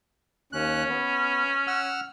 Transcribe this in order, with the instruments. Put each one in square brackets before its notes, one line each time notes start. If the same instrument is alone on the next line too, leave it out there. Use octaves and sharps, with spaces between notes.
[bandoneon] D#2 F#6 [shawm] C#4
[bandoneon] B3
F#5 E6 F6